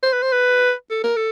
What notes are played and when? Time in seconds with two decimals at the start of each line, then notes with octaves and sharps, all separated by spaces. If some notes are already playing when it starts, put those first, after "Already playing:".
0.03 C5
0.13 B4
0.23 C5
0.33 B4
0.91 A4
1.04 A#4
1.17 A4